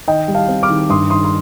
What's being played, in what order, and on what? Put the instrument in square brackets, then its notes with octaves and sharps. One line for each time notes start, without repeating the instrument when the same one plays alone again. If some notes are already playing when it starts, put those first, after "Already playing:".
[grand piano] D#3 D#5 G5
G3
F5 A5
C4
D6 F6
D#3
G2 C6 D#6
D#3 C6 D#6
C6